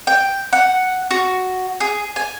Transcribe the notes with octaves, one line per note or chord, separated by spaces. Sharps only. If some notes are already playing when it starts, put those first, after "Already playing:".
G5
F#5
F#4
G#4
G#5